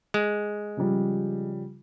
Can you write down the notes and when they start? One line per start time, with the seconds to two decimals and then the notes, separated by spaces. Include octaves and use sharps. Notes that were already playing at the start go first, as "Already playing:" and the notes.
0.14 G#3
0.77 C#3 F3 G3